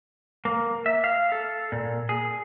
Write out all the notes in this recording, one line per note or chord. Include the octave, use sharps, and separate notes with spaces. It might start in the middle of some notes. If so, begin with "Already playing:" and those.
A#3
E5
F5
A4
A#2
G#4